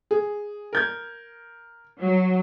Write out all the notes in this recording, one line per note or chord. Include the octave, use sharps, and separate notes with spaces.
G#4
A#4 G6 G#6
F#3